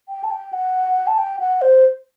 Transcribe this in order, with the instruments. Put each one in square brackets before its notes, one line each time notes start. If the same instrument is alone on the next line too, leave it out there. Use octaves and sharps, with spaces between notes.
[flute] G5
A5
G5
F#5
A5
G5
F#5
C5